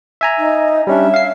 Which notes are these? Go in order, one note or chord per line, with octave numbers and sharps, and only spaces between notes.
E5 G#5 A#5
D#4
G3 C#4 D4 E5
F5 C7